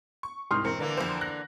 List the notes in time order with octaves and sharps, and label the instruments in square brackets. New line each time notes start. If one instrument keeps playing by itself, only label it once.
[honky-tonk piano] C#6
[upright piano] C2 G#2 [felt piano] C6 D#6 F6
[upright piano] E1 A#4 [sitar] C4 [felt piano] C#7
[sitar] D3 E3 A#3 [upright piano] A#4
[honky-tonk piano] F2 C5
[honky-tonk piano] F#6 [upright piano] A#6